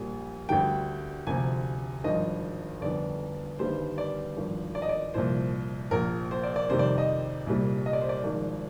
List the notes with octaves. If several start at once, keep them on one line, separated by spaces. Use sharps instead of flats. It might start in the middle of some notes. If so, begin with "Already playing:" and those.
Already playing: A#1 A#2 G3 G#5
D2 D3 G3 G5
D2 C3 F3 G#5
G#1 G2 F3 D#5
G1 F2 D3 D5
G1 G2 D#3 G3 C5
D5
G#1 G2 F3
D5
D#5
D5
C2 A#2 F3 C5
A#1 A#2 F3 A#4
C5
D5
D5
F2 C3 D#3 G3 C5
D5
D#5
C2 A#2 G3
D#5
D5
C5
D5
G#1 G#2 F3